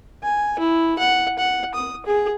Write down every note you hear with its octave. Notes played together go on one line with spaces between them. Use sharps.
G#5
E4
F#5
F#5
D#6
G#4